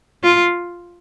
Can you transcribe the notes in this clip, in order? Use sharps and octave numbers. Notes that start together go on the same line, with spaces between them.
F4